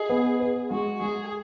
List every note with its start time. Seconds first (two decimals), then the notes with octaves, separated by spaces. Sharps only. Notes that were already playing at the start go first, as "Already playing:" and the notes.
Already playing: G#4 D#5
0.09 B3
0.40 B4
0.70 G#3 F#4
1.01 G#3 G#4